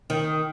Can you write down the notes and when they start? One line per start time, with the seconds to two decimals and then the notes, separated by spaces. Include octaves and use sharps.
0.10 D#3